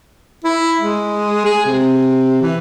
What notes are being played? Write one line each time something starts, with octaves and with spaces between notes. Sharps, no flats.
E4
G#3
G#4
C3
E3